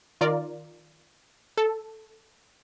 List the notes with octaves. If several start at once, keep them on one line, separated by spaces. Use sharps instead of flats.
D#3 F4 A#4 D5
A4